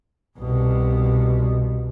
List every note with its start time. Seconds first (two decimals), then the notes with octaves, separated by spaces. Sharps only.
0.39 C2 B2